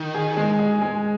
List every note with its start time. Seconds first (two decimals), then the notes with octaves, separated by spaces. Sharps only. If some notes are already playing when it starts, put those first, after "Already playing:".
Already playing: D#3
0.14 G#4
0.37 G#3
0.59 G#4
0.82 G#3